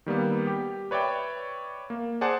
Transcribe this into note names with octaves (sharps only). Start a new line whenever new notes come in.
D#3 G3 A#3 B3
G4
B4 C#5 D5 E5 G5
A#3
G#4 C5 D5 F#5 A5